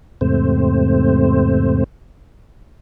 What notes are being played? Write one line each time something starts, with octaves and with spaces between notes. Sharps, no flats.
E2 G#2 C3 A3 C4 C5